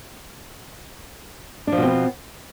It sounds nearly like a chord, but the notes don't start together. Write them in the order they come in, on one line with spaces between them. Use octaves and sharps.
D4 F3 B2 C4 B3